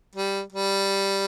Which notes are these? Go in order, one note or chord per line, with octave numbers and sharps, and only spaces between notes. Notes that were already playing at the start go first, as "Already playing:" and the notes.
G3
G3